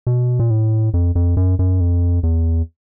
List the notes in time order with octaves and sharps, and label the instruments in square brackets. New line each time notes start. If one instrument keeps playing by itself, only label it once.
[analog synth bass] B2
A#2
A2
F2
F2
F#2
F#2
F2
E2